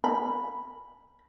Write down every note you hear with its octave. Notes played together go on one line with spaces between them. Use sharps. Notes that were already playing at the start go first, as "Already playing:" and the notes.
B5